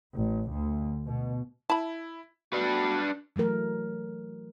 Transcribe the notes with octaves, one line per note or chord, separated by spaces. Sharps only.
A1
D2
B2
E4 A5 B5
A3 B3 D4 F#4 B4
E3 F#3 A3 A#4